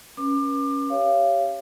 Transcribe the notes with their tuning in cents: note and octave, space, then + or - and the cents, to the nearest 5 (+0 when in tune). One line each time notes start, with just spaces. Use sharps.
C#4 +0 B4 -40 D6 +30
G4 +0 C#5 +0 F5 -30